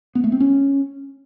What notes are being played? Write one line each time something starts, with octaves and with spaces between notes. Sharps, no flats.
B3
A3
C4
C#4